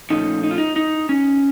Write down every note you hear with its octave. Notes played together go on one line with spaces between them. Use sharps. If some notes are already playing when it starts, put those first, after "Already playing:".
A#2 F3 A3 C#4 D#4
D#4
F4
D#4
D#4
C#4